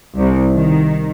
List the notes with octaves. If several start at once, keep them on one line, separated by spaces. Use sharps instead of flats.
C2
D#3